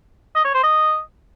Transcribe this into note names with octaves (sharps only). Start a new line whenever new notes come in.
D#5
C#5
C5
D#5